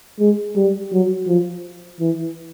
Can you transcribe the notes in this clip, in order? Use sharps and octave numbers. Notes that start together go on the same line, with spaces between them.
G#3
G3
F#3
F3
E3